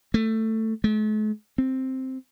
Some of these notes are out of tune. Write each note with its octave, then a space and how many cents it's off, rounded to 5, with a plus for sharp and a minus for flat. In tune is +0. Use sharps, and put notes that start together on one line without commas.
A3 +15
A3 -45
C4 +0